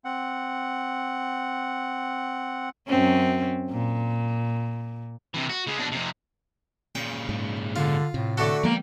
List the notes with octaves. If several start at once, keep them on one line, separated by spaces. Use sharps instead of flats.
C4 F#5
F#2 C4 C#4
A#2
C3 E3
F#4
C#3 G#3
B2 D4
F2 C3
A#2 C#3 G5
G#2
D3 F4
A2 C3
D3 A3 F#4 A4
F3 G#3 A#3 B3 D5 G5